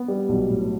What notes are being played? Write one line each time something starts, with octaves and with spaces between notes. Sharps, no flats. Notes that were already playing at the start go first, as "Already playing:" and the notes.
Already playing: B3
G3
B1
A2